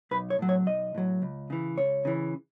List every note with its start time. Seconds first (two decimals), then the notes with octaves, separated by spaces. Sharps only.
0.11 B1 B4
0.30 C#5
0.39 A2 F#3
0.49 C#5
0.66 B1 D#5
0.94 A2 F#3
1.22 C#2
1.50 C#3 E3
1.78 C#2 C#5
2.05 C#3 E3